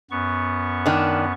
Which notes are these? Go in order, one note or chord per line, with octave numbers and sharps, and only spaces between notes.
F#2 B3 C#6
D#3 D4